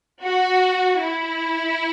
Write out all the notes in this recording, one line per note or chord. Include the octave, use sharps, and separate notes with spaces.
F#4
E4